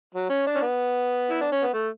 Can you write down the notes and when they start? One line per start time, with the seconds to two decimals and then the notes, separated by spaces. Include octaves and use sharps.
0.15 F#3
0.30 C#4
0.47 D4
0.55 C#4
0.62 B3
1.30 E4
1.41 D4
1.52 C#4
1.63 B3
1.73 A3